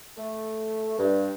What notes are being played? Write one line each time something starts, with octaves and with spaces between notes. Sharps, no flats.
A3
G2